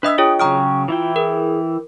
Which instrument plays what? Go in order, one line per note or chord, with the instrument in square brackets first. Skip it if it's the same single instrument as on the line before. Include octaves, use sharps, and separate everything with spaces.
[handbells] D4 D#5 D#6 [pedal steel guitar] B4 E5 E6
[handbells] F4 G#4 C#5 [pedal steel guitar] G5 [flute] D#6
[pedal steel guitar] C#3 F#3 G5 [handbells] A#5 D#6 F6 [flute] C#6
[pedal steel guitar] E3 E4 G5 [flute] F4
[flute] G#4 [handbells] A#4